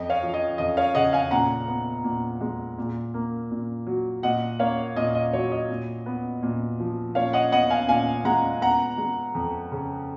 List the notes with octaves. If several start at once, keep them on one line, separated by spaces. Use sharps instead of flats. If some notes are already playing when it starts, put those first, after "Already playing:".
Already playing: F2 D#5
C#5 F5
F3
D#5
F2 D#5
C#5 F5
C#3 D#5 F#5
F5 G#5
A#2 F#5 A#5
B3
A#2
G#3
A#2
A#3
A#2
F#3
A#2 D#5 F#5
A#3 C#5 F5
A#2 D#5
D#5
F#3 C#5
D#5
A#2
B3
A#2
F3
A#2 C#5 F5
D#5 F#5
B3 D#5 F#5
F5 G#5
A#2 F5 G#5
G#3 F#5 A#5
B3 F#5 A#5
G#3
F2
C#3